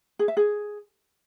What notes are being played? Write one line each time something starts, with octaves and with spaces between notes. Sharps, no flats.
G#4
E5
G#4